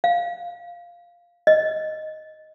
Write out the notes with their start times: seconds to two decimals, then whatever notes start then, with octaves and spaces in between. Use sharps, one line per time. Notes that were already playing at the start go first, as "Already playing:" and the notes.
0.04 F5
1.47 D#5